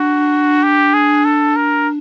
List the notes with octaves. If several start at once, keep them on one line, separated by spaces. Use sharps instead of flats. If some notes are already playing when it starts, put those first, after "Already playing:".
Already playing: D4 F#4
G4
G#4
A4
A#4